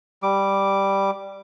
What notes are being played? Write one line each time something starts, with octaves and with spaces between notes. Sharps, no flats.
G3 D6